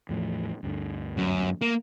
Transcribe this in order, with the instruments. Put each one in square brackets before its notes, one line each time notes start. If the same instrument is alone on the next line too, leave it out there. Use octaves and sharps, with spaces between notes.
[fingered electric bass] E2 A2 F3
D2 G2 D3
[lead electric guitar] F#2
A#3